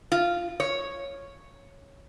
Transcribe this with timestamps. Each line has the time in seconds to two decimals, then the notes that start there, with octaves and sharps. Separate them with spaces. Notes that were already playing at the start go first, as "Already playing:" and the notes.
0.12 F4
0.60 C#5